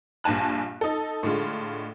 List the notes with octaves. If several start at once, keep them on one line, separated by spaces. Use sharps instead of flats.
A#1 G2 G#5 A5 F#6
D#4 A4
A2 D3 G#3 F4